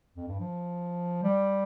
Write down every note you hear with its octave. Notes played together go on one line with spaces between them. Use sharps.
F2
G2
F3
G3